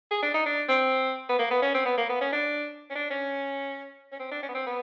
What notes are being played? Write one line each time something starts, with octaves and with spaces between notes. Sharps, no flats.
G#4
D4
D#4
D4
C4
B3
A#3
B3
C#4
C4
B3
A#3
B3
C#4
D4
C#4
D4
C#4
C#4
C4
D4
C#4
B3
C4
B3